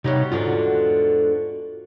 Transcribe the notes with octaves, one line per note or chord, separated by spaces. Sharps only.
C3 G3 B3 D#4 F#4 C#5
E2 G#2 D3 F4 F#4